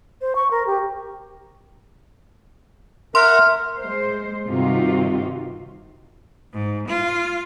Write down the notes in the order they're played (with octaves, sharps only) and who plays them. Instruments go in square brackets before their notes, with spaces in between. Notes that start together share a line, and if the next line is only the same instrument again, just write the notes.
[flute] C5
C#6
A#4
G4
[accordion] A#4 E5 F#5 [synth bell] C6 [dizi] F6
[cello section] G#3 C5
G2 C3 D#3 D#4 F4 F#4
[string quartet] G#2
F4